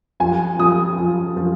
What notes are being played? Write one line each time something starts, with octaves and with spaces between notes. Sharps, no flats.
F3 G#5
F3 D#6
F3
F3